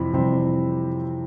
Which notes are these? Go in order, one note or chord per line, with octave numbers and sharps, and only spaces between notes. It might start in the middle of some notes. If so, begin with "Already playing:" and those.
Already playing: F2 C3 E3 C4 B5
F2 C3 E3 G3 C4